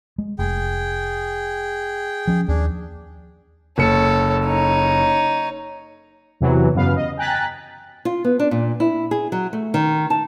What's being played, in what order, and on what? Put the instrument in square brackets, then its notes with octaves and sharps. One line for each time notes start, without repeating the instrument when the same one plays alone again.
[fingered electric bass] G#3
[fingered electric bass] F1 [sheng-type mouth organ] G#4 G5
[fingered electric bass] F3 C#4
[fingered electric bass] D#2 [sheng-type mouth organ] D4 G#4
[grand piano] F#1 C#7 [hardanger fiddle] A4 C#5
[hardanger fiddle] D#4 C#5
[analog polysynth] E2 C3 E3 F#3
F#2 C#3 B3 B4 F5
D#5
G5 G#5 A#5 F#6 A6 B6
[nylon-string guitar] F4
B3
D4
A#2
E4
G#4
F#3
A3
D#3
A5